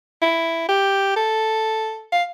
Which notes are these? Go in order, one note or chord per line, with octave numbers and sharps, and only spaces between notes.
E4
G4
A4
F5